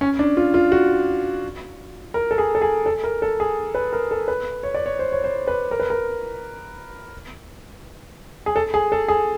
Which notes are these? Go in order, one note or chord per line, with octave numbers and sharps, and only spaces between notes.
C#4
D4
F4
F4
F#4
A#4
A4
G#4
A4
G#4
A4
A#4
A4
G#4
B4
A#4
A4
B4
C#5
D5
C#5
C5
C#5
C5
B4
A#4
B4
A#4
G#4
A4
G#4
A4
G#4